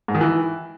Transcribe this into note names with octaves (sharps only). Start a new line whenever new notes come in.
G#2
D#3
E3